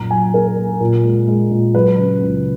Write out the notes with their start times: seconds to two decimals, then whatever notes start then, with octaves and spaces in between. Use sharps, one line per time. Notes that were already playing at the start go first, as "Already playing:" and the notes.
Already playing: F#2 A#2 A#5
0.11 F#3 G#5
0.34 A#3 A#4
0.57 A#3
0.80 A#2
1.04 G#3
1.27 G#3
1.51 A#2
1.74 F#3 B4
1.98 C#3
2.21 C#2